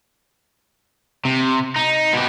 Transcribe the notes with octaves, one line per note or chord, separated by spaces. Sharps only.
C3
D#4
B2 G4